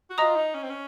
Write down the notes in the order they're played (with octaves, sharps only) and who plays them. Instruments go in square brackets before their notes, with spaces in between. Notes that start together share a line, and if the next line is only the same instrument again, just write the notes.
[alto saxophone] F#4
[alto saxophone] F4 [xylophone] D#5 A#5 D#6
[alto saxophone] D#4
C#4
C4
C#4